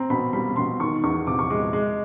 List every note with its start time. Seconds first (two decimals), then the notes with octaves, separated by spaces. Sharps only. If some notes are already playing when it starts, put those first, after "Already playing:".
Already playing: C4 A#5
0.10 B2 B5
0.33 G3 B5
0.56 B2 C6
0.80 D#3 C#6
1.03 E2 C#6
1.27 C3 D6
1.39 C#6
1.50 G#3 D6
1.73 G#3